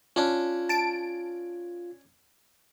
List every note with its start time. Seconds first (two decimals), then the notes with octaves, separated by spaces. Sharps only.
0.16 C#4 D4 F4
0.69 A5 D7